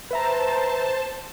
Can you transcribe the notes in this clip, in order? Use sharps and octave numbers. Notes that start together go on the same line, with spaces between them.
B4 C5 E5 A5 A#5